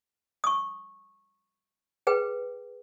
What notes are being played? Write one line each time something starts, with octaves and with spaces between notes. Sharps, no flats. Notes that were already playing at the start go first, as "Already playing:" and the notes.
C#6 D#6
G#4 B4 G5